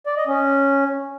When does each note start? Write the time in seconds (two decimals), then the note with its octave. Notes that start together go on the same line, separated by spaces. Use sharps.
0.06 D5
0.17 D#5
0.27 C#4